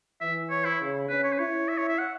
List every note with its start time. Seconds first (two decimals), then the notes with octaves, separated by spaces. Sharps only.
0.21 E3 E5
0.51 C#5
0.65 E4
0.81 C#3
1.09 C#4 B4
1.24 C#5
1.33 B4
1.39 E4 C#5
1.68 E5
1.78 C#5
1.88 E5
1.98 F#5